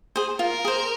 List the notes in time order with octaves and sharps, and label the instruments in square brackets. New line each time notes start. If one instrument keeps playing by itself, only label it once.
[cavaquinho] G#4 C5
[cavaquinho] F4 [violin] A#4
[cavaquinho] G#4 C5